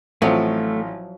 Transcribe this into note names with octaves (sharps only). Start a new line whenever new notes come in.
A1 F3 F#3 A3 C4 F4